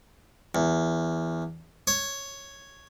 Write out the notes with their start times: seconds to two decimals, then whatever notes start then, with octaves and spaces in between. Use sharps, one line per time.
0.55 E2
1.87 C#5